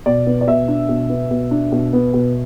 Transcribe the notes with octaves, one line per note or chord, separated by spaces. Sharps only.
B2 D5
B3
D5
B2 E5
D4
B2
B3
B2
D4
B2
B3
B2